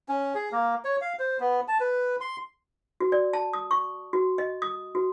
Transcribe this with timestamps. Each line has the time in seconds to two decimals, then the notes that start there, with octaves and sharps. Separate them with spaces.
0.09 C#4
0.35 G#4
0.52 A#3
0.85 C#5
1.01 F5
1.19 C5
1.40 B3
1.68 A5
1.80 B4
2.21 C6
3.00 F#4
3.12 D5
3.33 A5
3.53 D#6
3.71 C#6
4.13 F#4
4.38 D#5
4.62 D#6
4.95 F#4